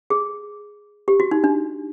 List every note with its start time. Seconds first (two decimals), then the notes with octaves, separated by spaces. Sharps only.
0.10 G#4
1.08 G4
1.20 F#4
1.31 D#4
1.44 D4